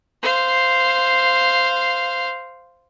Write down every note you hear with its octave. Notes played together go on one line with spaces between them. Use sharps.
C5 F5